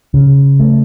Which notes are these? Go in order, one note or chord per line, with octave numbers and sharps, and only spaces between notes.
C#3
A3